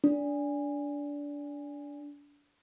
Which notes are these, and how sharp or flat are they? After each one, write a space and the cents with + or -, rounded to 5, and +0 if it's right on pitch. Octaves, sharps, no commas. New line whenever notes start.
D4 -20